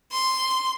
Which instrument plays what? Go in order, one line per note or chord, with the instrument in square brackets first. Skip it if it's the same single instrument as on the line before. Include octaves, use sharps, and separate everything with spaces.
[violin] C6